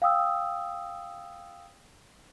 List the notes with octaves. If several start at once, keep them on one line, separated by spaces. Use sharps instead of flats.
F5 G5 D#6 E6